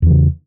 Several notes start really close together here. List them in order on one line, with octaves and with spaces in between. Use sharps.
E2 E3 C#3